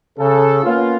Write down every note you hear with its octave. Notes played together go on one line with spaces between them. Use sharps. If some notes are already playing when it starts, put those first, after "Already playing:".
C#3 A4
A#3 B3 C#4 F4